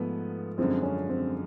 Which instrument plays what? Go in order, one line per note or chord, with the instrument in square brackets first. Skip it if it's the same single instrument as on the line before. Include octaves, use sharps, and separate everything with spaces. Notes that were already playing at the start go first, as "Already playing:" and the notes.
Already playing: [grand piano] G#2 F3 A3 [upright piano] B3
[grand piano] F#2 D3 F3 G#3 [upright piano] C4
[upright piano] C#4
C4